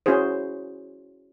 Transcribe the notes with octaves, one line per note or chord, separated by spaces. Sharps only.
C#4 E4 F#4 G#4 C5